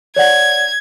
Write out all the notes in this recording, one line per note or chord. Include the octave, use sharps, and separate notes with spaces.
C#5 D5 F#5 G#6